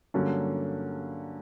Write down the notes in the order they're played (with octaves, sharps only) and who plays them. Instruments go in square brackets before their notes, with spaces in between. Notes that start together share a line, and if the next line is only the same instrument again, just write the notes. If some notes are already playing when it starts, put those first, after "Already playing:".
[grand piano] G2 D3 F#3 A#3 C#4